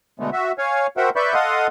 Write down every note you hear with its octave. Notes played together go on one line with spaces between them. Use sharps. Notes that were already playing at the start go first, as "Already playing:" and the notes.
B2 D3 G#3 A3 B3
F#4 E5
C#5 F5 G#5
F#4 A#4 C5 E5 F#5 G5
B4 D5 E5 B5 C#6 G6
A4 D#5 F5 F#5 C6 D#6